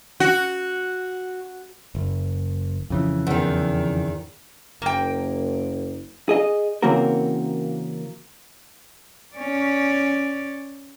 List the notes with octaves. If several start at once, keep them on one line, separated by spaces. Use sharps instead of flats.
F#4
F#1
F2 C#3 E3
E2 D#3
F#1 A#3 G5
G#4 D#5
C#3 E3 A#3 C4 F#4 A#4
C#4 D5